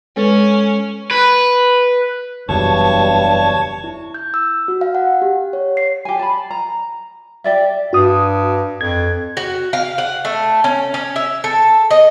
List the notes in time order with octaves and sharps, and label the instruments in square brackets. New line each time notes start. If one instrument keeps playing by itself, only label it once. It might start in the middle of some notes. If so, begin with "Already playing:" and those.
[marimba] G#3 A4 B4 [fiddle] C#4
[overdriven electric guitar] B4
[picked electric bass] F#1 E2 B2 [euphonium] G2 [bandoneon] C#5 C#6 [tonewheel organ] A5
[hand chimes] E4
G6
E6
F#4
F5
F#5
G4
C#5
C7
[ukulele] G4 G#5
A5 B5
A#5
G4 D5 E5
[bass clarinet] G2 [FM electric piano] F#4 D#6
[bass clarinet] F2 [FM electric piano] G#6
[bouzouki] F#4
F5
F#5
A3
C#4
C#4
E5
A4
D#5